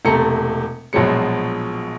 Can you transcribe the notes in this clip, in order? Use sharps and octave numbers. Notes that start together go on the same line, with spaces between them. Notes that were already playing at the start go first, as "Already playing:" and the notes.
E1 C3 A3 A4 A#5 C#7
A#1 B2 F3 F#3 G#3 C#7